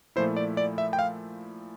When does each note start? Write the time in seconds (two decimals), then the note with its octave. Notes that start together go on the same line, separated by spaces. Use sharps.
0.16 A#2 F3 A3 E4 C5
0.37 D5
0.57 D5
0.78 E5
0.93 G5
0.99 F5